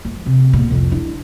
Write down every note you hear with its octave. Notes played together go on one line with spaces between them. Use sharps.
F3 G#3
C3
A#1 B2
C2 F2
D4 E4